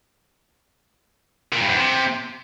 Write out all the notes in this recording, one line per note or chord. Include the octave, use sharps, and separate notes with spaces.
A#2
G2
E2
C3